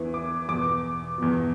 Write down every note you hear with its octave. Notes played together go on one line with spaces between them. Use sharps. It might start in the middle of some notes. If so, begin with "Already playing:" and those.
Already playing: E2 E3
D6
E2 B2 D6
E2 B2